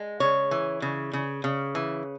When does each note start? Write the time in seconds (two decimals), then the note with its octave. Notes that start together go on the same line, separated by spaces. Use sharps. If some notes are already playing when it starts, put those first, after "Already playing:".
Already playing: G#3
0.20 C#3 C#5
0.51 E3
0.82 C#3
1.13 C#3
1.44 C#3
1.75 E3